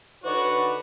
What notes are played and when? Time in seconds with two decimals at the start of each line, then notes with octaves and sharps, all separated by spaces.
0.24 D3 D#4 F#4 B4 C#5 D5